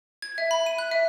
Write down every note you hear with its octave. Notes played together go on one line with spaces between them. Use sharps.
G#6
E5
B5
D#7
F#6
E5